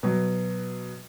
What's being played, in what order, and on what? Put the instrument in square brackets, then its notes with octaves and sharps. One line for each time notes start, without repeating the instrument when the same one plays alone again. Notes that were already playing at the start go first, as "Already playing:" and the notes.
[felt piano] B2 F#3